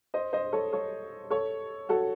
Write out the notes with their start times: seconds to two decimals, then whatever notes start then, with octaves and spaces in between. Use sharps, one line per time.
0.14 C5 D#5
0.33 C5 D#5
0.53 A4 C#5
0.73 A4 C#5
1.30 A4 C#5
1.89 F#4 A4